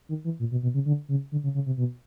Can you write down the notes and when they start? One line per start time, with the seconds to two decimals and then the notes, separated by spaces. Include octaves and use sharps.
0.09 D#3
0.24 E3
0.39 A#2
0.51 B2
0.63 B2
0.74 C#3
0.86 D3
1.09 C#3
1.32 D3
1.44 C#3
1.55 C#3
1.66 C3
1.77 B2